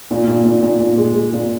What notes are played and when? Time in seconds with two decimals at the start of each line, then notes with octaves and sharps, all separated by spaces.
0.11 A#2
0.28 A#2
0.45 A#2
0.63 A#2
0.80 A#2
0.98 G#3
1.15 G#3
1.33 A#2